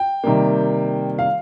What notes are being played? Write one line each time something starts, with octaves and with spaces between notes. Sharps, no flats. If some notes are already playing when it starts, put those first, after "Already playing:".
Already playing: G5
C3 D#3 G3 A#3
F5